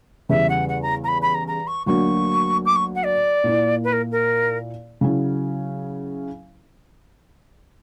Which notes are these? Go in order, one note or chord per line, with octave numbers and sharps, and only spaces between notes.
E2 C#3 G3 E5
F#5
F#5
A#5
A#5
B5
B5
A#5
A#5
C#6
D2 D3 F#3 A#3 C#6
D6
C#6
F#5
D5
A#2 A#3 E4
B4
A#4
A#4
C#3 F#3 C#4 E4